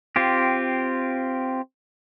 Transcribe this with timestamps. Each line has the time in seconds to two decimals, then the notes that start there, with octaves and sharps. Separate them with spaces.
0.16 C4 F4 G4